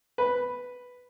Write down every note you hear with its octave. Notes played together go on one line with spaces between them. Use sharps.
B4